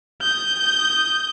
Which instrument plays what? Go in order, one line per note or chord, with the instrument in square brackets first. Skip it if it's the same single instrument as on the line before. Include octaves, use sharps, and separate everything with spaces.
[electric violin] D#6 G6